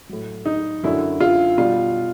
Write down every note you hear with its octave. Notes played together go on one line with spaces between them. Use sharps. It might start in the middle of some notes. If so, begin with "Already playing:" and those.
A2 F#3
D#4
F#2 D3 F#3 E4
F4
B2 G3 F4